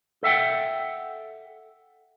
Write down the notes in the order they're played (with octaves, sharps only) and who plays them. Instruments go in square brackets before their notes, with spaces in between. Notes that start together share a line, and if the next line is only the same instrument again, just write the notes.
[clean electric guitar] A4 E5 F#5 G5